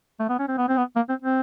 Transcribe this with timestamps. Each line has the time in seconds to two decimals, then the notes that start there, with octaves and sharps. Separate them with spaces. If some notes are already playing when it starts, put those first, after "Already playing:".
0.19 A3
0.29 B3
0.39 C#4
0.48 C4
0.57 B3
0.68 C4
0.77 B3
0.96 A#3
1.09 C4
1.22 C4